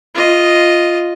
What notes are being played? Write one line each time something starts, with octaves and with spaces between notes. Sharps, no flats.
F4 D#5